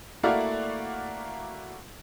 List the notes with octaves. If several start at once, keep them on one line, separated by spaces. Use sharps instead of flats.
A3 A#3 E4 F#4 D5 F5